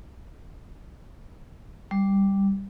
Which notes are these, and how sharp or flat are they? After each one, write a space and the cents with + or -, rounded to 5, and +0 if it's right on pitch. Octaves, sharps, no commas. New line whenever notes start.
G3 +5